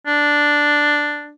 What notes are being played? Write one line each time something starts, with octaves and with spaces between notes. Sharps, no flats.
D4